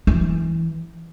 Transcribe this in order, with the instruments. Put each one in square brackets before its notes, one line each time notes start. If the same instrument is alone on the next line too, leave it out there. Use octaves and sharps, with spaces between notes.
[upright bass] E3